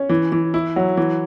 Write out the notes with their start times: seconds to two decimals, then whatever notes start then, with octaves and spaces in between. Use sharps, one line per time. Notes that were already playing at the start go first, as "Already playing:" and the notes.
Already playing: C#4
0.09 E3
0.32 E3
0.54 E4
0.76 F#3
0.97 E3